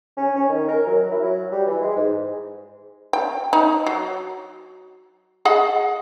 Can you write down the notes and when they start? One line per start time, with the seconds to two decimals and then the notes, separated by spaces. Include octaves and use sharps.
0.17 C#4
0.36 C#4
0.49 D#3
0.69 A#4
0.87 F#3
1.11 E4
1.24 F#3
1.52 G3
1.66 E3
1.82 G#3
1.96 G#2
3.13 G5
3.53 D#4
3.86 F#3
5.45 G#4 D#5 F#5